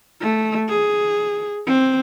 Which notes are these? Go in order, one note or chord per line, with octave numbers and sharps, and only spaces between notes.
A3
G#4
C4